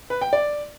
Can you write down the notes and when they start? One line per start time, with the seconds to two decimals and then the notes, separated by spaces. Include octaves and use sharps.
0.10 B4
0.21 G5
0.33 D5